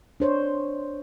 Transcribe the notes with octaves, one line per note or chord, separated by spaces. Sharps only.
D4 C5 C#5